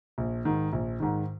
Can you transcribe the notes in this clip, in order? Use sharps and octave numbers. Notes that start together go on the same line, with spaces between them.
A#1
G#2 D#3
A#1
G#2 D#3